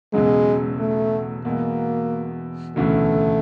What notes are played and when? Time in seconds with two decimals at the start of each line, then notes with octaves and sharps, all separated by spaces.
0.14 E1 E2 C#3 F#3 G#3
0.79 A3
1.45 E2 B2 G#3 A#3
2.76 E1 D2 C#3 E3 A3